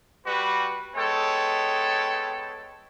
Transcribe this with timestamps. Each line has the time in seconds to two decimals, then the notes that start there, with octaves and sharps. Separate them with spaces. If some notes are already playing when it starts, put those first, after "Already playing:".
0.27 G3 F#4 B4
0.96 G#3 B3 A4 C#5 G5